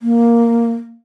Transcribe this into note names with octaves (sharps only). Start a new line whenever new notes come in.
A#3